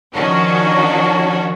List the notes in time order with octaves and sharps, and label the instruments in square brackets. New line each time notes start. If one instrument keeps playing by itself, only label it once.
[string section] D#3 F3 C#4 D4 F#4